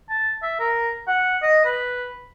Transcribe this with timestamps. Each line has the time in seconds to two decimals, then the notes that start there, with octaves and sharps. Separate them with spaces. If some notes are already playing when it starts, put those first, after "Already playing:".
0.10 A5
0.42 E5
0.60 A#4
1.08 F#5
1.43 D#5
1.65 B4